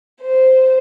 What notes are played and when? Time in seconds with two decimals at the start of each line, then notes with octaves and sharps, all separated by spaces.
0.21 C5